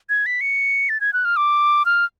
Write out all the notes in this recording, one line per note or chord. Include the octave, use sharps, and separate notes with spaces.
G#6
B6
C#7
A6
G#6
F#6
F6
D6
F6